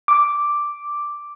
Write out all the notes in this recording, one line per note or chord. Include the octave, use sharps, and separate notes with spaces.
D6